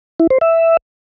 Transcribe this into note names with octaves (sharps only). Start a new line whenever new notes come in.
E4
C5
E5